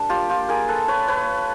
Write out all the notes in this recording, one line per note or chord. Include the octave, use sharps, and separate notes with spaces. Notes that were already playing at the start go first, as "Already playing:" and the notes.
Already playing: G3 A#3 D4
F4 G4
F4 G4
G#4 A#4
A4 B4
B4 C#5
B4 C#5